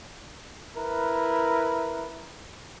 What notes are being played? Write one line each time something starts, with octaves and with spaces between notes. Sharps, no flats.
E4 A#4 B4